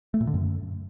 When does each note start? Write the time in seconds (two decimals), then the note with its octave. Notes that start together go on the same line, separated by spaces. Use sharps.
0.14 A3
0.21 A#2
0.27 D3
0.34 F#2